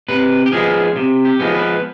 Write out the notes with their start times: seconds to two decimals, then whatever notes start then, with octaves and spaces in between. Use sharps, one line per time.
0.08 C3 B4
0.46 G4
0.52 F3 G#3 B3 G#4
0.96 C3
1.25 G4
1.40 F3 G#3 B3
1.54 B4